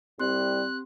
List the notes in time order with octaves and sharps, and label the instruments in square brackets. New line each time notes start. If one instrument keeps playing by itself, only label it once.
[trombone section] C2 G3 [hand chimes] C4 G4 C6 [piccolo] F#6